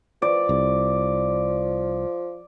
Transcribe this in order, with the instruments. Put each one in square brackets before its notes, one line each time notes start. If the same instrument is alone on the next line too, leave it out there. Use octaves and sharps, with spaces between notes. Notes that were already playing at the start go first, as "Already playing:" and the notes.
[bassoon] F3 [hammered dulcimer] D5
[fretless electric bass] C2